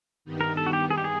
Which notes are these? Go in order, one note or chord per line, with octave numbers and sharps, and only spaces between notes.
G2 D#3 G3 B3 D#4
A#4
A4
F#4
G4
G#4
G4
G#4